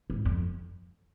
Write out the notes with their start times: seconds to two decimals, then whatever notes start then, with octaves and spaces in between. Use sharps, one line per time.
0.10 G#2
0.25 F2